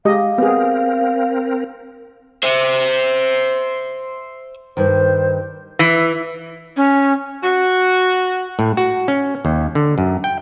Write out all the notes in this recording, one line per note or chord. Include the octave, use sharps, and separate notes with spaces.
G#3 G4 D#5 F5
B3 C4 G#4 A#4
C5 E5
G2 D#3 C5
E3
C#4
F#4
A2
F#4
C#4
D#2
D3
F#2
G5